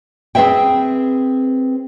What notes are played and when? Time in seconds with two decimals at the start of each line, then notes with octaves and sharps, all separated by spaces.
0.35 C4 G#4 B4 E5 G5